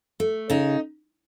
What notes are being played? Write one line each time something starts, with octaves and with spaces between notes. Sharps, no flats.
A3
C#3 D#4